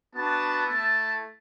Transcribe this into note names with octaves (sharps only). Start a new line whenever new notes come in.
B3 D4 F#4 A5
A3 E4 A5